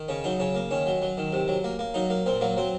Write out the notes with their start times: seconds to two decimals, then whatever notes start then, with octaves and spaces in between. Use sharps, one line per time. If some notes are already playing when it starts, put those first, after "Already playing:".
Already playing: D#3
0.08 C#3 C#4
0.24 F#3 D#4
0.40 C#3 C#4
0.55 A#3
0.71 D#3 C#4
0.86 F#3
1.02 F#3
1.17 D#3
1.33 C3
1.48 F#3
1.64 A#3
1.79 A#3
1.94 F#3 D#4
2.10 A#3
2.26 A#2 C4
2.41 F#3 A#3
2.57 F#3 C4